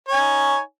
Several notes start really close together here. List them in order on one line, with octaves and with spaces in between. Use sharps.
C#5 G#5 D#4